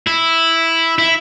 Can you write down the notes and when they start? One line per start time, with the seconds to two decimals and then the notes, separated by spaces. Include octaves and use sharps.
0.07 E4
0.98 E4